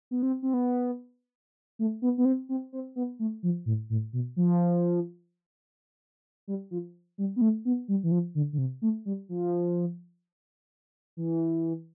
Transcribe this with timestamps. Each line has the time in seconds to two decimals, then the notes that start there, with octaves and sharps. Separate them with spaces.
0.11 B3
0.23 C4
0.42 C4
0.54 B3
1.79 A3
2.02 B3
2.18 B3
2.25 C4
2.49 C4
2.73 C4
2.96 B3
3.19 A3
3.43 F3
3.66 A2
3.90 A2
4.13 B2
4.36 F3
6.47 G3
6.71 F3
7.18 G3
7.36 B3
7.41 A3
7.65 B3
7.88 G3
8.04 E3
8.11 F3
8.35 D3
8.53 D3
8.58 C3
8.82 A3
9.06 G3
9.29 F3
11.17 E3